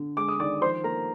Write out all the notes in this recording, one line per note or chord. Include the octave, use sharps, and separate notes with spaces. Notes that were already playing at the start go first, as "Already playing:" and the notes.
Already playing: D3
G#3 D6
D#6
D#3 D5 D6
F3 C5 C6
A#3 A#4 A#5